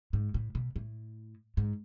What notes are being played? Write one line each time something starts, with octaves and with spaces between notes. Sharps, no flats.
G#2
A2
B2
A2
G#2